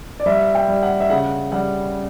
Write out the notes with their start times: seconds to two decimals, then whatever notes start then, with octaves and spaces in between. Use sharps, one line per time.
0.20 D5
0.26 G3 E5
0.55 G5
0.68 G3
0.83 F#5
1.00 E5
1.10 C#3 F#5
1.52 G3 F#5